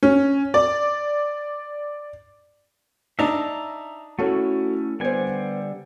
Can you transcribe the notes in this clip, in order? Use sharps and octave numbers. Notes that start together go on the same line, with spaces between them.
C#4
D5
D4 D#4 E5 A5 A#5
A3 C#4 E4 F#4 A4 C#5
D3 G3 B3 C5 G#5